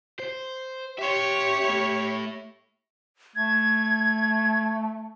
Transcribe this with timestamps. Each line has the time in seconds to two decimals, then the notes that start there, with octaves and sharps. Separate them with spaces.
0.19 C5
0.98 G4 C#5 E5 C6
1.64 A3 E4
3.36 A3 G#6